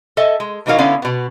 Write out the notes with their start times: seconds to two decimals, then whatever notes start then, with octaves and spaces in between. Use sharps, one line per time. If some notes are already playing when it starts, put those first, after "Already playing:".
0.17 A4 D#5 E5 G#5
0.40 G#3
0.66 A2 E3 F#3 D#4 A#4 F5
0.78 D3 B3 C#4 E4 F5 G#5
1.02 B2 B3